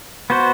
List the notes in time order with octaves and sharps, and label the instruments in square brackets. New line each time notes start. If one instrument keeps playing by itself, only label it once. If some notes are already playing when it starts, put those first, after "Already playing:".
[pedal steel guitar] B3 F#4 C5